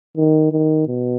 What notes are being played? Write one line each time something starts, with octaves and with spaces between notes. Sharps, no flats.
D#3
D#3
B2